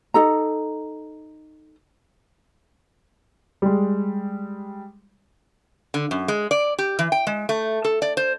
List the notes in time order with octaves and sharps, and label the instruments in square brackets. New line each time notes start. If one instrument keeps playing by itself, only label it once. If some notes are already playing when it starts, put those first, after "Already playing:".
[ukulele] D#4 A4 A#5
[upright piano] G3 G#3
[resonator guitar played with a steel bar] D3
F#2
G#3
D5
G4
E3
G5
G#3
A3
A4
D5
C5